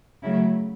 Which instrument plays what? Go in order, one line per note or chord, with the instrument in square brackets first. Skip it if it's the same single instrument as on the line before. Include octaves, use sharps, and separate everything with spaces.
[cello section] C#3 F#3 A3 E4